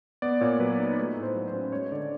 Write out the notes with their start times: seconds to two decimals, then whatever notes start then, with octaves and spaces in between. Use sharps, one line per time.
0.22 B3 D5
0.41 A#2 C#5
0.60 F#3 B4
0.79 D#4
0.98 A3 B4
1.17 A2
1.23 C5
1.35 F#3
1.48 C5
1.54 C#4
1.72 G#3 C#5
1.92 D3 D5